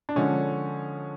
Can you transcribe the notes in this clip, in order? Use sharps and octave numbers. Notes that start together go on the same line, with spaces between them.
D4
D3 F3 G#3 C#4